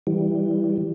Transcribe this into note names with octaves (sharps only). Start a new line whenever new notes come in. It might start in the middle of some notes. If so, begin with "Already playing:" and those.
E3 G3